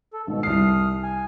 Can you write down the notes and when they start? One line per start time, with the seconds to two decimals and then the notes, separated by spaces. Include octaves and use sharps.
0.14 A4
0.27 G#1 B2
0.43 C2 D#6 F6 C7
1.03 G#5